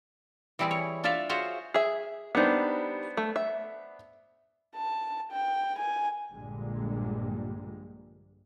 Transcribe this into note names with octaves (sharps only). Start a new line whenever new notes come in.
E3 G3 C4 E4 G#4
C#5
D4 F4 A4 D5 E5 F5
F4 F#4 G#4 C5 C#5 E5
G#4 E5
G3 B3 D4 D#4 C5
A3
E5
A5
G5
G#5
A#1 G2 A#2 D3 G3 G#3